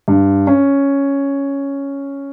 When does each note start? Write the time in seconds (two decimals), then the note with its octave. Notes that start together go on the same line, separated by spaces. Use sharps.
0.08 G2
0.47 C#4